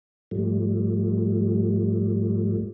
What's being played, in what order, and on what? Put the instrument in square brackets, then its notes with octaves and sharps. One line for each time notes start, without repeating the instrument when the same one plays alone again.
[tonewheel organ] G#2 F3 G3 A3